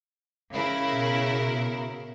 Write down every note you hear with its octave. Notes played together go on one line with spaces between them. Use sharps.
C#3 E4 A#4
B2